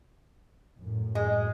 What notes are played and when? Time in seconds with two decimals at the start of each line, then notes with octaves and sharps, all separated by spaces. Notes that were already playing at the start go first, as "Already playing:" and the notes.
0.80 F#2 A2
1.15 G#3